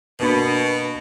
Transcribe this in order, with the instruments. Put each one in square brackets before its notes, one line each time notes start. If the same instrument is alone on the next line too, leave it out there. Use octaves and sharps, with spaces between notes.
[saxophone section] B2 [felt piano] A#3 D4 B5